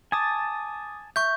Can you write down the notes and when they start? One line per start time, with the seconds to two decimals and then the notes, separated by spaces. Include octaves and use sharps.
0.12 G#5 A5 D6 D#6 A6
1.16 E5 C#6 G6